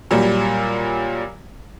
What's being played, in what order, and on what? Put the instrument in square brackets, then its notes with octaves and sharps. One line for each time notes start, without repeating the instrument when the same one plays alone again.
[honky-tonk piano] A#2 F#3 G3